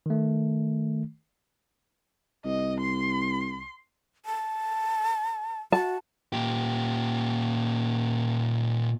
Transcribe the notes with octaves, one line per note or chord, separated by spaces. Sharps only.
D#3 A3
C2 D#5
C6
A5
F#4 A5
A#2 G4